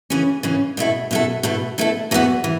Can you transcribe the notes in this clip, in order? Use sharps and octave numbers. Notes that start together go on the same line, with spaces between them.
C#3 E3 C#4
C#3 E3 C#4
B2 A3 E4 A4
B2 A3 E4 A4
B2 A3 E4 A4
B2 A3 E4 A4
E2 E3 B3 F#4
E3